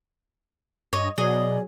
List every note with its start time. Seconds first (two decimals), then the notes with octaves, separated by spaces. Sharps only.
0.93 G2 C#5 D#5
1.18 B2 F#3 G#4 D5 D#5